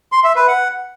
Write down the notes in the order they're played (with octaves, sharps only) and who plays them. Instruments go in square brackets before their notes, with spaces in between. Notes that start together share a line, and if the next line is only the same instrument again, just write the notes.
[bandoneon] C6
E5
B4
F#5